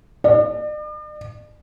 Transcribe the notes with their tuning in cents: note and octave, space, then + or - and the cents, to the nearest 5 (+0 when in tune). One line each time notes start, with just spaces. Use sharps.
D5 +45